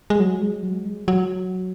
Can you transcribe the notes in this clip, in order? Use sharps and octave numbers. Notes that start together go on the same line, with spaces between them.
G#3
F#3
G#3
F#3
G#3
F#3